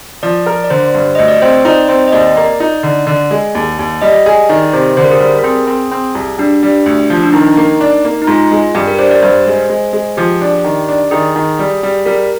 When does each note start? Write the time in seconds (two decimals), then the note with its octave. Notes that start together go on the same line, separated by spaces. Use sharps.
0.23 F3 D5
0.46 A#4
0.64 D5
0.70 D3 C5
0.94 G2
1.15 D2 D#5
1.28 D5
1.42 C4 C5
1.65 D#4 D5
1.89 C4 C5
2.08 D#5
2.13 D#2 D5
2.37 A#3
2.60 D#4
2.83 D3
3.07 D3
3.31 G#3
3.55 D#2
3.79 D#2
4.01 G3 D#5
4.26 G#4
4.49 D#3 D5
4.73 C3 C5
4.97 D3 C5
5.04 A#4
5.12 G#4
5.20 G3 A#4
5.38 A#4
5.43 C4 G#4
5.67 C4
5.91 C4
6.15 C2
6.38 G3 D4
6.63 G3
6.86 D2
7.10 F3
7.23 D4
7.33 D#3 D#4
7.57 A#3
7.81 D4
8.05 A#3
8.22 D#4
8.27 G#2 F4
8.51 G#3
8.75 G2 G4
8.87 A#4
8.99 D4 C5
9.11 D5
9.23 G2 C5
9.46 G#3
9.70 G#3
9.93 G#3
10.17 F3 G4
10.41 D4
10.64 D#3
10.88 D4
11.11 D#3 G#4
11.36 D#3
11.59 G3
11.83 G3
12.06 G3 A#4